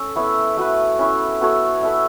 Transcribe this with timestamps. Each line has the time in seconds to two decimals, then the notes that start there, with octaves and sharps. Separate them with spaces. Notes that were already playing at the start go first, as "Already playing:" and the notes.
Already playing: C#4 A4
0.16 B3 E4 C#5 E5
0.57 A3 F#4 B4
0.99 C#4 E4 C#5
1.41 B3 F#4 A4 C#5
1.83 E4 A4 E5